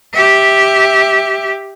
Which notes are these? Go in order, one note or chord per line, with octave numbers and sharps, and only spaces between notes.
G4 E5